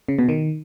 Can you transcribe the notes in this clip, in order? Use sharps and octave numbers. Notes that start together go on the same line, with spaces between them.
C#3
B2
D#3